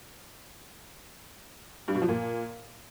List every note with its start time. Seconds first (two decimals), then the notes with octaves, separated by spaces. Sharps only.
1.88 G2
1.95 B2
2.02 F3
2.09 A#2